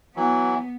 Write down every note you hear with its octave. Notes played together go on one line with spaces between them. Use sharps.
E3 F#3 B3